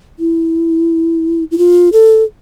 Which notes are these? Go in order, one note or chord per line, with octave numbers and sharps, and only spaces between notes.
E4
E4
F4
A4